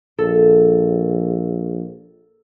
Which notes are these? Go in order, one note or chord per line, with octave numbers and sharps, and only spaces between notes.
A#1 A4